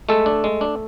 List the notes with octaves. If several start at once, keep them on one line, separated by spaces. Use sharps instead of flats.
G#3 A3 A4
D4
G#3
D4